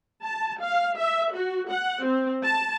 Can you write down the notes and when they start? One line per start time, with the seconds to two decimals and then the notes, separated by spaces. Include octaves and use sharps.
0.24 A5
0.63 F5
0.97 E5
1.34 F#4
1.69 F#5
2.05 C4
2.44 A5